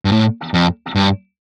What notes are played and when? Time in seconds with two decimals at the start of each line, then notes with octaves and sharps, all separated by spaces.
0.05 G2
0.12 A2
0.54 F2
0.95 G2